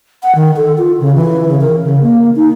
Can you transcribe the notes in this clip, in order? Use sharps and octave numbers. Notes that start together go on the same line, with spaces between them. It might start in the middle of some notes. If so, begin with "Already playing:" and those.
F#5
D#3
A4
F4
C#3
E3
C#3
A#4
C#3
A#3
D#4